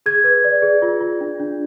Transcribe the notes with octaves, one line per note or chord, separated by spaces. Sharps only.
G#4 G#6
B4
D5
G#4
F4
F4
D4
D4